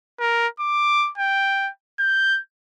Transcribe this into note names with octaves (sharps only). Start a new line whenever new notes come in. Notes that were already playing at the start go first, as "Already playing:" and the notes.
A#4
D6
G5
G6